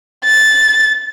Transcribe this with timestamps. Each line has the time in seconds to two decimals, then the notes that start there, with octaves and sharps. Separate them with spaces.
0.25 A6